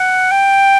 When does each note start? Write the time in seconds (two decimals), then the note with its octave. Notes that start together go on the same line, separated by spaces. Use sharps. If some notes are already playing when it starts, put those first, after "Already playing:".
Already playing: F#5
0.32 G5